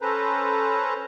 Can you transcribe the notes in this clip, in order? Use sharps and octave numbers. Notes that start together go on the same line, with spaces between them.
C#4 A4 B4 C5 A#5